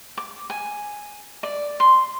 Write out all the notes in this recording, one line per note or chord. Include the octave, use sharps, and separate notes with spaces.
D6
G#5
D5
C6